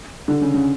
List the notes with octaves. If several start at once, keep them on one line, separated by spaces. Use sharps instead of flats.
D3
C#3
C#3